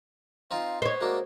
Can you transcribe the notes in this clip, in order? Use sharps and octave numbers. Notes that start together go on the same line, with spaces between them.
C4 D#4 F4 F5
B3 C5 C#5 D#5
G#3 A#3 D4 F#4